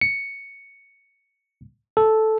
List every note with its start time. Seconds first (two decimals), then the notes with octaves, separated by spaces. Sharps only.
0.01 C#7
1.97 A4